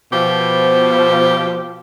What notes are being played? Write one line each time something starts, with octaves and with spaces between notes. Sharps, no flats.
B2 F3 G4